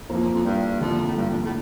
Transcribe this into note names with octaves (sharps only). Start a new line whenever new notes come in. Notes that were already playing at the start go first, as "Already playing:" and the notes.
F2 E3 A#3 F4 A4 C5
F2
G2
F2 D3 F3 A#3 E4
A2
G2
F2
A2